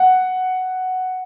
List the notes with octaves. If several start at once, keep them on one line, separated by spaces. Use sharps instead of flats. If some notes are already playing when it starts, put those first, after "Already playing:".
Already playing: F#5